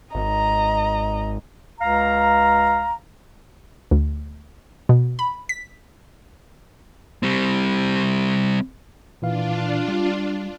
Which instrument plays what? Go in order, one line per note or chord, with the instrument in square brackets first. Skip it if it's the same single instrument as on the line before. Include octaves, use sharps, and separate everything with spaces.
[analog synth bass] G#1 [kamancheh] D#5 A#5
[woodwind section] C#2 F5 A#5
[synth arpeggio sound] D2
B2
B5
B6
[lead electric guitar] G3 C4
[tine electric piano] A#2 E3 F5 [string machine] D4 F4
[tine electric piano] G3